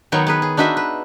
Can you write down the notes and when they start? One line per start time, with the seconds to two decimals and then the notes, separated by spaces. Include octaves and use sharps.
0.12 D#3 F#3 B3 D#4 C#5
0.27 B3 G#4 B4
0.42 G#4
0.57 D4 D#4 F#4 B4 E5
0.77 B4